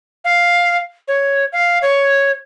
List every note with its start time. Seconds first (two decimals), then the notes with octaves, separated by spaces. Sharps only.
0.24 F5
1.08 C#5
1.52 F5
1.82 C#5